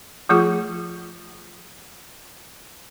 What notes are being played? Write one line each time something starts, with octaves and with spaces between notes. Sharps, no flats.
F3 A3 F4 G#4 D6